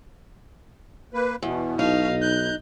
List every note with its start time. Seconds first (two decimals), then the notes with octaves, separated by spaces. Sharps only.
1.14 A#3 B4
1.43 E2 B2
1.79 B1 D#4 F5
2.22 F#6 G6